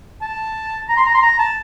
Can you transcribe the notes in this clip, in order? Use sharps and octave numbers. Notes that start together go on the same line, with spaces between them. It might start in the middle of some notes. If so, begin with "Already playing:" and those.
A5
A#5
C6
A#5
C6
A#5
A5